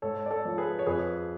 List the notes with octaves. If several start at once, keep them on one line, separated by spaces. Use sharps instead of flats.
G#2 A4 C#5
D5
A4 C#5
F3
G#4 B4
C#5
F2 G#4 B4